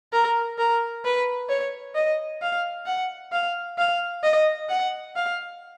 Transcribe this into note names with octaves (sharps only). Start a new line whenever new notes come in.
A#4
A#4
B4
C#5
D#5
F5
F#5
F5
F5
D#5
F#5
F5